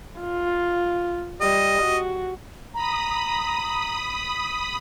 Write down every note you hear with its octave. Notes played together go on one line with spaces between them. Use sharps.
F4
G3 D#5
F#4
A#5 B5 D#6